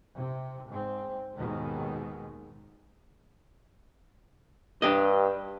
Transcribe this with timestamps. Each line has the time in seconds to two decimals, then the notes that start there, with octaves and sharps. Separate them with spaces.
0.16 C3
0.69 G#2 C4
1.35 D#2 G#2 B2 D#3 G#3
4.82 G2 D4 G4 D#5